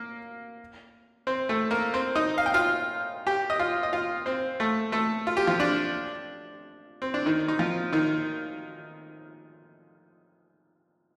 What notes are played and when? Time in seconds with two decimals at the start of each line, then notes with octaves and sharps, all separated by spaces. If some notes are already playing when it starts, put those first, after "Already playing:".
Already playing: A#3
1.27 C4 C5
1.49 A3 A4
1.71 A#3 A#4
1.94 C4 C5
2.15 D#4 D#5
2.38 F5
2.46 G5
2.54 F4 F5
3.27 G4 G5
3.50 D#5
3.59 F4 F5
3.83 D#5
3.93 F4 F5
4.26 C4 C5
4.60 A3 A4
4.92 A3 A4
5.27 F4
5.37 G4
5.47 F3 F4
5.60 D4
7.02 C4
7.14 D4
7.26 D#3 D#4
7.48 D#4
7.59 F3 F4
7.93 D#3 D#4